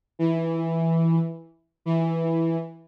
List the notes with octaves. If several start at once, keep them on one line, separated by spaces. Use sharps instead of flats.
E3
E3